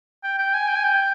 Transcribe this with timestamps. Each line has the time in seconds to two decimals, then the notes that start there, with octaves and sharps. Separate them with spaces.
0.24 G5
0.39 G5
0.54 G#5
0.68 G5
0.76 G#5
0.84 G5